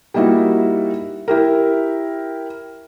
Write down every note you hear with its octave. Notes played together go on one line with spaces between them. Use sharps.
G3 A#3 D#4 E4 F#4
E4 G4 A#4